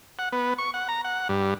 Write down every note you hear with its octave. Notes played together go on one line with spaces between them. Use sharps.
F#5
B3
C#6
F#5
A#5
F#5
G2